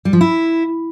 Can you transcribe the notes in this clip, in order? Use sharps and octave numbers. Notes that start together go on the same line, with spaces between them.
G3
F3
E4